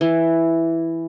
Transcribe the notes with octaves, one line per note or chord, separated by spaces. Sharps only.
E3